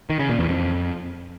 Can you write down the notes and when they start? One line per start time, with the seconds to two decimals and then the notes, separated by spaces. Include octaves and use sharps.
0.10 D#3
0.19 C#3
0.29 A#2
0.39 E2
0.49 F2